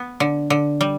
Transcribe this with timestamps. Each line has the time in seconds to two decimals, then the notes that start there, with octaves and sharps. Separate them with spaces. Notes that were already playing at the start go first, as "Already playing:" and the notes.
Already playing: B3
0.20 D3
0.50 D3
0.81 G3